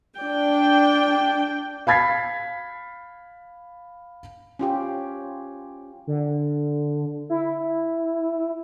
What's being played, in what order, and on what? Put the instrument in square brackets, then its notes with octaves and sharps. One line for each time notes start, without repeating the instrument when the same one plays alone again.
[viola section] D4 G5
[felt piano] F5 B5 G#6 A6 B6 C7
[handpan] C#4 F4 G4
[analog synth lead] D3
E4